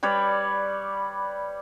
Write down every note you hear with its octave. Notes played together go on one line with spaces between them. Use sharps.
G3 B4 C#5 D5